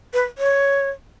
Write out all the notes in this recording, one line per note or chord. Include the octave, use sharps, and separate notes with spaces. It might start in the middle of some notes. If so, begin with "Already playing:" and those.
B4
C#5